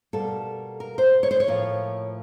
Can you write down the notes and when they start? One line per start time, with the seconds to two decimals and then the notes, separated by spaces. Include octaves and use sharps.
0.13 B2 G3 A#3 A4
0.80 A#4
0.98 C5
1.23 C#5
1.31 C5
1.40 C#5
1.48 A2 F3 A#3